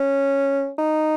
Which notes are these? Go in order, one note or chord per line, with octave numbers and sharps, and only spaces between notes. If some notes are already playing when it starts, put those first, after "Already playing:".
Already playing: C#4
D#4